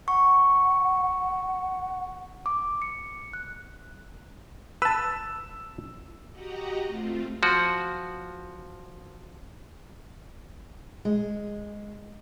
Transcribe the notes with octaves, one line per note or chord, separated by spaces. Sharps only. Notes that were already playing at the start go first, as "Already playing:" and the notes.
F#5 C#6
D6
C#7
F#6
B4 A5 E6
F#4 G4 D#5 F#5 A#5
A3 C4 F4
F3 F#4
G#3